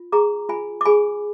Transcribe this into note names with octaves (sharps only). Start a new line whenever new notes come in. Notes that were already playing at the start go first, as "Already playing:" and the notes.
Already playing: F4
G#4 A#5 D6
F4 G#5 B5
D6
G#4 G#5 B5